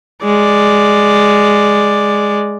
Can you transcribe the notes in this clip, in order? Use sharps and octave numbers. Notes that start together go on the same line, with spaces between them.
G#3 D5